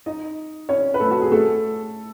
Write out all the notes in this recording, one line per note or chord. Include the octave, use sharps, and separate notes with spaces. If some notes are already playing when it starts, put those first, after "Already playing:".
D#4 D#5
C#4 C#5
B4
A3 A4
F#4
G#4
A3 A4